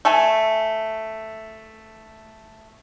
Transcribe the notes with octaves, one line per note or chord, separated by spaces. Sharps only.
A3 E5 G#5